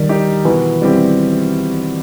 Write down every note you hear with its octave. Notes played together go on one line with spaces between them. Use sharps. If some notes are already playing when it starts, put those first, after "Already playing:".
Already playing: D#3 G3
D#4 G4
B2 E3
G3 C4 E4 G4